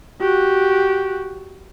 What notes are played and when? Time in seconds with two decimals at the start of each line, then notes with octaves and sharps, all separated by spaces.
0.20 F#4 G4